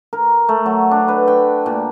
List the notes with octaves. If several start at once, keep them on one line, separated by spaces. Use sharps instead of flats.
A#4
A3
F#3
D4
B4
G5
A#2